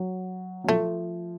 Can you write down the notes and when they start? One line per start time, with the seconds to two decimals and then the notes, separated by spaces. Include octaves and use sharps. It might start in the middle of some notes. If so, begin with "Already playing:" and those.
Already playing: F#3
0.64 F#3
0.68 F3 A3